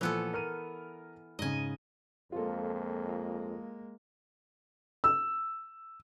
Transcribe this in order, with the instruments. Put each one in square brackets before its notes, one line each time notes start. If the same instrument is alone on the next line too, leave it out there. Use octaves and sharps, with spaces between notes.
[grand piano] A#2 F3 [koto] E3 B3 A4
[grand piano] A#4 F6 D#7
[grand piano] G#2 C#3 [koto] D#5 G#5
[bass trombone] F2 [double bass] G#3 A#3 [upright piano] F4 A4
[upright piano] E6